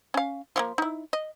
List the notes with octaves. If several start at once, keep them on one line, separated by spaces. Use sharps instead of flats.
C#4 F5
F3 F#3 A#3
D#4 E4
D#5